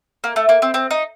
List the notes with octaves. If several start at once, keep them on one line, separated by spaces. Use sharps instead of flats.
A#3
A3
A#3
C4
C4
D#4